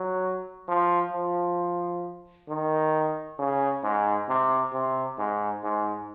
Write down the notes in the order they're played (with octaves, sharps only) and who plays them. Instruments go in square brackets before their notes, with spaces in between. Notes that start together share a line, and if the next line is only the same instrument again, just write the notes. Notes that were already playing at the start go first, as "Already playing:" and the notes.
Already playing: [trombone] F#3
F3
F3
D#3
C#3
G#2
C3
C3
G#2
G#2